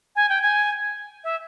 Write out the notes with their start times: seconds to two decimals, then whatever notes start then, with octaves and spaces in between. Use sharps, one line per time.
0.16 G#5
0.29 G5
0.42 G#5
1.24 E5